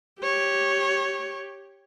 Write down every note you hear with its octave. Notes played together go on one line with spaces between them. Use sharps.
G4 C#5